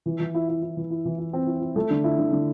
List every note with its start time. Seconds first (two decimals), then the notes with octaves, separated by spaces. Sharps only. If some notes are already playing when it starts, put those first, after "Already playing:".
0.06 E3
0.20 E3
0.35 E4
0.49 E4
0.62 E4
0.77 E3
0.91 E4
1.05 E3
1.18 E4
1.33 C4
1.47 E4
1.61 E4
1.76 A3
1.91 D3
2.04 E4
2.19 D3
2.32 D3